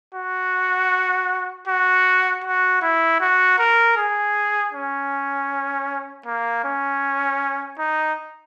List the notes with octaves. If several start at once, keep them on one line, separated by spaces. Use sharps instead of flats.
F#4
F#4
F#4
E4
F#4
A#4
G#4
C#4
A#3
C#4
D#4